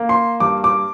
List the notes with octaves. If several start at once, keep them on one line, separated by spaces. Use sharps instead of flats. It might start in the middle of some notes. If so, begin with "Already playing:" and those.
Already playing: A#3
C6
G2 D6
D6